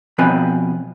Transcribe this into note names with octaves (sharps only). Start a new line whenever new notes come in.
B2 F3 C4 B4 G#5 B5